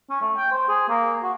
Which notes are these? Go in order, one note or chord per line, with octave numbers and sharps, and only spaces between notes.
C#4
A3
G5
C5
G#4
A#3
F#4